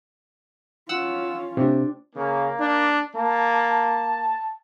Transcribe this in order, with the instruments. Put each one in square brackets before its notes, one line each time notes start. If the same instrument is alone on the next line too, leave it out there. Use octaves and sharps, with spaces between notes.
[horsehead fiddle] C#4 F4 [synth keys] F#5 E6
[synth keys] C3 [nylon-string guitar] C4 D4
[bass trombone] C#3 [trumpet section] A#3
[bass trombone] D4
[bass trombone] A#3 [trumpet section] A5